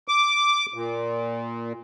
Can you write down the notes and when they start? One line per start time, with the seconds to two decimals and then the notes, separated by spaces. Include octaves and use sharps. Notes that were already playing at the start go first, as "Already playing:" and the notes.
0.08 D6
0.74 A#2